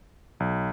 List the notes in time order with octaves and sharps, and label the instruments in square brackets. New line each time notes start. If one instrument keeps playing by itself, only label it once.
[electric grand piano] B1